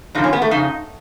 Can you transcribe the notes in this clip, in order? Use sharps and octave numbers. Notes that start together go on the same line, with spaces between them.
G2 D3 F3 D#4
C#4
B3
A3
F2 C#3 D#4